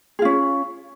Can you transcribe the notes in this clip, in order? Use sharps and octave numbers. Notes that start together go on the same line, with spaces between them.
C#4 F4 G#4